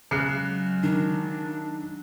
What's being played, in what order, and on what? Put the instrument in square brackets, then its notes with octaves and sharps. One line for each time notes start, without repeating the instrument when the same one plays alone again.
[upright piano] C#3 [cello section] F#3 G#3 [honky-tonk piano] F#6 C7 C#7
[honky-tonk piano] D#3 [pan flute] D4